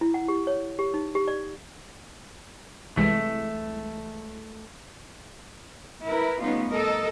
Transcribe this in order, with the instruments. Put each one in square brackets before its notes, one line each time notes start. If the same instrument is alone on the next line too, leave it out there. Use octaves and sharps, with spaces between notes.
[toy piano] E4
F#5
G4
C#5
G4
D#4
G4
D5
[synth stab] C2 E3 G#3 [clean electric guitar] A3
[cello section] E4 A#4 B4
G3 A3 B3 C#4 D#4 F4
A4 A#4 D#5